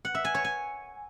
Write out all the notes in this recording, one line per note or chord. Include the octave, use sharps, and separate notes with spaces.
F#5
E5
G#5
C#5
G#5